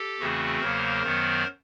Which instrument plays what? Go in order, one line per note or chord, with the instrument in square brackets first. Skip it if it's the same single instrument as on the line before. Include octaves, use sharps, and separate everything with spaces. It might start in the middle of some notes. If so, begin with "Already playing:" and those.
Already playing: [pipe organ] G4 A4
E2 C#3 E3 A3 C4 F#4 G#4
E2 C#3 F#3 A#3 A#4 C5
F#2 D#3 F#3 B3